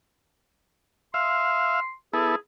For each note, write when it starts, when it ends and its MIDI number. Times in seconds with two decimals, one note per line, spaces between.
1.14 1.80 76
1.14 1.80 77
1.14 1.93 84
2.13 2.35 59
2.13 2.35 64
2.13 2.36 68
2.13 2.35 69